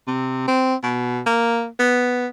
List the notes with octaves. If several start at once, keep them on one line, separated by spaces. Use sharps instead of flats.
C3
C4
B2
A#3
B3